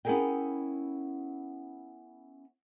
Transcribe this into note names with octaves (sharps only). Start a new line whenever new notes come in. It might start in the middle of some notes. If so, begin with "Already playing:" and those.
B3 C#4 E4 G#4 A#4 G5